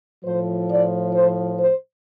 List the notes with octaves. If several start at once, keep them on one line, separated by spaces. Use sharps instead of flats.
A2 F3 C5
D5
C5
C5